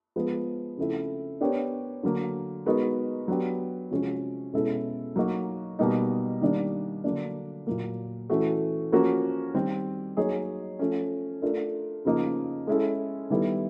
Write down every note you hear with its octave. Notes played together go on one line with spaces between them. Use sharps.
F3 G#3 B3
C#3 F3 A3 C4 E4
B3 D4 G4 A#4 C#5
D3 F#3 A#3
G#3 B3 D#4 F#4 A#4
F#3 B3 D4 G4
C3 F3 G#3 C#4 F#4
B2 G#3 C#4 E4 A4
F#3 A#3 D#4 F#4
B2 G3 A#3 D#4
D#3 G3 A#3 D4
D3 F#3 A#3 D4
A#2 F#3 A#3
E3 A3 C#4 F#4 A4
F3 A#3 C#4 F#4 A#4
D#3 G3 C4
F#3 A#3 D#4 G#4 C#5
F3 A3 C#4
A3 D4 F4 A#4
C#3 F3 A#3 D#4
G#3 C#4 E4 A4
D#3 G3 B3 E4 A4